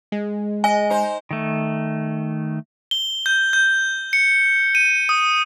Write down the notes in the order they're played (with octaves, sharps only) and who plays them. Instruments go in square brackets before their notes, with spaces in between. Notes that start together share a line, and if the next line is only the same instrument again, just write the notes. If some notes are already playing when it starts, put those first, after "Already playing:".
[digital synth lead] G#3
[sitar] D#5 [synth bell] G#5
[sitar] D#4 C5
[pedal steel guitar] D#3 A3
[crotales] G7
G6
G6
C#7
D#7
D#6